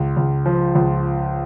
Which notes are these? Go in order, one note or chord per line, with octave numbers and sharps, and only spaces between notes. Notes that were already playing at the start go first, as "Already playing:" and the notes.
Already playing: C#2
C#2
F3
C#2